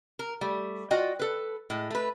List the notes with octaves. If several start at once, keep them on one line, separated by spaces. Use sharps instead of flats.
A#4
G3 A3
F4 F#4 D5 D#5 G5
A4 B4
A2 G#3
A3 B4